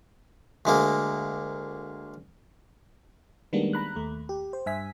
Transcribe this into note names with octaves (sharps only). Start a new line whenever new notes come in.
D2 G#3 A#3
D#3 G3 G#3 A#3 B3 D4
A#5 B5 F#6
D#2 A3
G4
C5
G2 E5 G#5 B6